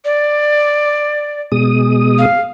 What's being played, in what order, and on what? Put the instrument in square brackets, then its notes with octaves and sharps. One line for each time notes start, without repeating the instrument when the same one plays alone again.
[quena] D5
[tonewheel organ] B2 G#3 D#6
[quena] F5